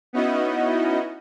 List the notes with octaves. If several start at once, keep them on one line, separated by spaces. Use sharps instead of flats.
B3 C#4 D#4 E4 F#4 D#5